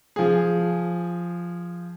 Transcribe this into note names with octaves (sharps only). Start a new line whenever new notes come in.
F3 G#4